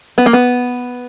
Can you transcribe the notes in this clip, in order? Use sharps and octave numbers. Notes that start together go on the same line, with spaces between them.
B3
A#3
B3